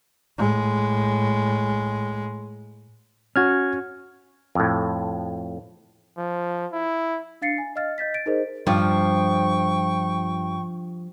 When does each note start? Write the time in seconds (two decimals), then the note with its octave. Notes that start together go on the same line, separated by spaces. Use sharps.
0.38 A2 G#3
3.36 C#4 F#4 F6 G#6
4.55 F2 A2
6.17 F3
6.73 E4
7.42 D4 F5 A6 C7 C#7
7.58 G#5
7.76 D#5 F5 F6 A6
7.98 D#5 G6 A6 B6
8.14 A6 D7
8.26 D#4 G#4 A#4 C5 D#5
8.67 G2 F3 G5 C#6